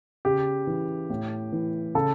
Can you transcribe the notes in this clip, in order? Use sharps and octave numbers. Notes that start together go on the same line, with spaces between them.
C#3 G4
E3
A2
E3
C#3 A4